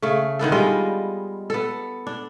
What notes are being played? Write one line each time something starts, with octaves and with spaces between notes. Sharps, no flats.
C#3 A3
D3 D#3 B3 A4
G3 G#3 F4 D#5
B3 A4
D4